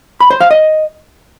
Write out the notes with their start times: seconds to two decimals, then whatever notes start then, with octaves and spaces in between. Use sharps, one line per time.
0.20 B5
0.30 C5
0.41 F5
0.51 D#5